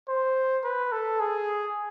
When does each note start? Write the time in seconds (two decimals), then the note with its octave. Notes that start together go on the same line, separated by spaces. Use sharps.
0.08 C5
0.64 B4
0.92 A4
1.20 G#4